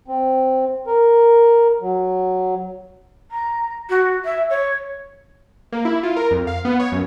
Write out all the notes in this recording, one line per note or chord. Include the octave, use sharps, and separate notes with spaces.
C4
A#4
F#3
A#5
F#4
E5
C#5
A#3
E4
F4
A#4
F2
F5
B3
C#5
F#2